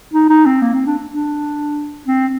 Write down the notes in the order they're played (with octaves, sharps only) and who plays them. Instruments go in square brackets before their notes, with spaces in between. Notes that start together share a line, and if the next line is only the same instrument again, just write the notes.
[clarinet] D#4
D#4
C4
A#3
C4
D4
D4
C4